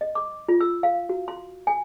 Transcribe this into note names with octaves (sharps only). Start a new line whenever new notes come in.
D#5
D6
F4
E6
F5
F#4
C6
G#5